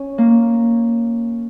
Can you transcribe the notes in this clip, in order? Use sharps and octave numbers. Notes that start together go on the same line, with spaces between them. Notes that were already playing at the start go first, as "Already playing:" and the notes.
Already playing: C#4
A#3